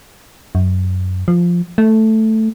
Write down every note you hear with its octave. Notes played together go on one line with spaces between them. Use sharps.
F#2
F3
A3